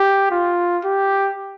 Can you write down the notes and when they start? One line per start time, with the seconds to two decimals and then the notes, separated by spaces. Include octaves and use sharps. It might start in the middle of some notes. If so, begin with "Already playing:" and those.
Already playing: G4
0.31 F4
0.85 G4